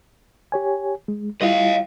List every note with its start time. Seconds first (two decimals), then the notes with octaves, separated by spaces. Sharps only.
0.52 G4 C#5 G#5
1.08 G#3
1.42 G3 E4 F4 D#5 F5